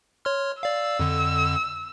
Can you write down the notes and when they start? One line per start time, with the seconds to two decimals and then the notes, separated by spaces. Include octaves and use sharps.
0.25 C#5 C6 F6
0.63 D5 F5 E6
1.00 F2 D3